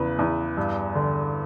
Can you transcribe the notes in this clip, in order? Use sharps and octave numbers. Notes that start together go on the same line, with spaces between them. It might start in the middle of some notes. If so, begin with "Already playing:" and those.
Already playing: E2 C#3 B4
E2
G2
D3